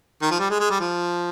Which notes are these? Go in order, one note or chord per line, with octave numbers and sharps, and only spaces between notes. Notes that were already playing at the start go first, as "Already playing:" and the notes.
D#3
F3
G3
G#3
G#3
G3
F3